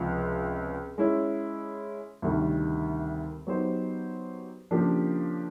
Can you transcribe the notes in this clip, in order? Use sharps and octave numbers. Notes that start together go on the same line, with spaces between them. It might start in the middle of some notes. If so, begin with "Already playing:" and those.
Already playing: C#2 C3 F3
G#3 C#4 E4
D2 C3 D#3 G3
F#3 B3 D#4 G4 C5
C#3 F3 A#3 D4 G4